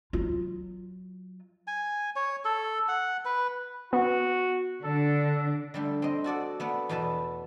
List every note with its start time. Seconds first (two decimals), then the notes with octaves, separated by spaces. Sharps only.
0.13 F#3 F4
1.67 G#5
2.16 C#5
2.45 A4
2.88 F#5
3.25 B4
3.93 B3 F#4
4.84 D3 D4 A4
5.74 D3 G3 A3
6.02 C4 D#5
6.24 F#4 A4 D5 F#5
6.60 A3 B3 D5 F#5
6.89 E2 B2 B4 A5